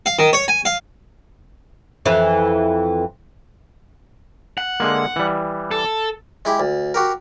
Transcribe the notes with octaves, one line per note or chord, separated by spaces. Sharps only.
F5
D#3
C#5
G#5
F5
F2 E3
F#5
D3 G#3 A#3
E3 G3
A4
G#3 E4 G4
D2
F#4 G4 A#4